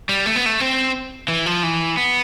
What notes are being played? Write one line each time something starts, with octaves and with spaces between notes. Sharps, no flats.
G3
A3
B3
A3
C4
E3
F3
E3
B3